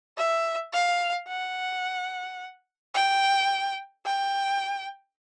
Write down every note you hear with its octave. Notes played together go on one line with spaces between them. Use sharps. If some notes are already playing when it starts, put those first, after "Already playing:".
E5
F5
F#5
G5
G5